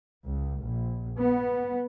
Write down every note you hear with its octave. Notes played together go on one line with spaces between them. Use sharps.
C#2
A#1
B3